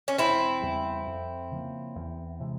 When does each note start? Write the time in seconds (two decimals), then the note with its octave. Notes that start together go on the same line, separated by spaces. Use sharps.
0.08 C#4
0.18 E1 C4 E4
0.62 E2 C#3 G3
1.07 F2
1.51 C#3 F3 A#3
1.95 E2
2.40 C3 E3 G#3